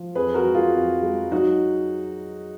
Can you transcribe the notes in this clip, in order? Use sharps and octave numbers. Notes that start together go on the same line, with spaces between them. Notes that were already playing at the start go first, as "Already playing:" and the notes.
Already playing: F3
F2 G#4 B4
F#4 A#4
G#3
F4 G#4
F2
G#3
F#3 D#4 F#4